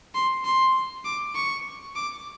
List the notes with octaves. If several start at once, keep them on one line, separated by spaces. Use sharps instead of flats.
C6
C6
D6
C#6
D6